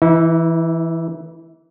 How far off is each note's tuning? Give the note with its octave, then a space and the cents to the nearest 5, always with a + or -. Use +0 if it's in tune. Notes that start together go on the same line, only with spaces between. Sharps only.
E3 +0 E4 -45